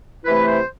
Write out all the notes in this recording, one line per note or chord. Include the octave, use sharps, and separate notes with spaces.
C3 E3 A3 E4 B4
C5